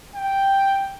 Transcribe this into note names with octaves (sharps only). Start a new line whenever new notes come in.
G5